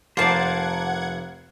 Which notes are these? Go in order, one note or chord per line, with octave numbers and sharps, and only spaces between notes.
F1 A#3 C5 D5 F#5 A5 G#6